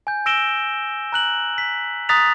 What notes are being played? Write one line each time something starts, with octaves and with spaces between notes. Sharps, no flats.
G#5 G6
E6 A#6 D7 E7 G7
A#5 F#6 F#7
B6
A#5 D#6 F#6 A6 B6 F7